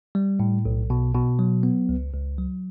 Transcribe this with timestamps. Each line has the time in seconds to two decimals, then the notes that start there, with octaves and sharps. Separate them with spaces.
0.15 G3
0.40 A2
0.65 B1
0.90 B2
1.15 B2
1.39 F#3
1.63 B3
1.89 C#2
2.13 C#2
2.38 F#3